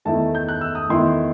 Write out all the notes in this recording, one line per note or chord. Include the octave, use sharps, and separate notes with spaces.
E2 D#3 A3 E4 A5
G6
F#6
E6
D#6
E2 D#3 A3 E4 C6